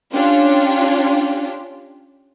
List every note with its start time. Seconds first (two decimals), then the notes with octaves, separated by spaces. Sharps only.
0.13 C#4 D4 F4 G4